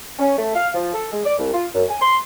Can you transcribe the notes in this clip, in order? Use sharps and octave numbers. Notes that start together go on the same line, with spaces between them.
C#4
A3
F5
F3
A4
G#3
D5
C2
F4
F#2
G#5
C6